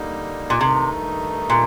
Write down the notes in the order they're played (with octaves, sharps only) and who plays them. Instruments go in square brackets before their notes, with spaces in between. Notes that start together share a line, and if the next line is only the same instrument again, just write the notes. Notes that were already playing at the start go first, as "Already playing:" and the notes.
Already playing: [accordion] D3 G3 A#3 D#4
[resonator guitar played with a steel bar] A#2
[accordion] G2 D#3 A3 D#4 [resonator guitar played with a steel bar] C3
[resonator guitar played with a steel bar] A#2